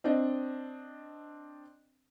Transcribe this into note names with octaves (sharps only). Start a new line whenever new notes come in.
C4 D4 D#5